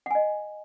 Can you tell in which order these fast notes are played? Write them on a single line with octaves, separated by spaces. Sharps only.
F#5 G#5 D#5